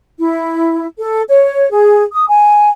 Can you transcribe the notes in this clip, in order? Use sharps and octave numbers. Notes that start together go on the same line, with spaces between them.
E4
A4
C#5
G#4
D#6
G#5